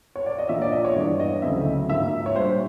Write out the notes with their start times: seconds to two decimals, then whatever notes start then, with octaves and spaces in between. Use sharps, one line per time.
0.16 C#5
0.26 D5
0.38 D#5
0.49 A#2 F3 A#3 D4 E5
0.62 D5
0.72 D#5
0.85 C#5
0.96 G2 E3 G#3 B3 D5
1.20 D#5
1.42 D2 C#3 F#3 A3 C4 E5
1.89 G#2 F3 A#3 D#4 E5
2.26 C#5
2.36 A#2 G3 A#3 D4 C5